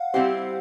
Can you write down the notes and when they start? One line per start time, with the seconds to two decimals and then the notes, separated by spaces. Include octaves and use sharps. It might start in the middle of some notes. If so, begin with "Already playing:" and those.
Already playing: F5 F#5
0.14 G3 C4 E4 G4 C5